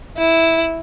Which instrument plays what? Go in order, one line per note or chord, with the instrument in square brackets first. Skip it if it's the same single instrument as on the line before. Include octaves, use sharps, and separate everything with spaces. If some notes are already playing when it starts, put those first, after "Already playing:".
[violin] E4